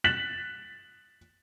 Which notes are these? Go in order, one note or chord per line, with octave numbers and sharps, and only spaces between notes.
F#6 A6 B6 E7 F#7